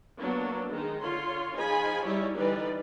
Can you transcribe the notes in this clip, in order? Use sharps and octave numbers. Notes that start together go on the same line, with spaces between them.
F#3 A#3 B3 D4
D#3 G#3 D#4
D3 F4 C#5 C6
F3 D#4 G#4 G#5 B5
G3 D#4 E4 G4 C#5
D3 E3 G3 D#4 B4 D5